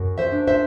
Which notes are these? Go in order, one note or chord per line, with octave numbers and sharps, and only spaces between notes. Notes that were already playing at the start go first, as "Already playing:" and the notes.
Already playing: F#2
C5 E5
D4
C5 E5